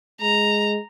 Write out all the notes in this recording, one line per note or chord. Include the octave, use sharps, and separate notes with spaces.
G#3 A#5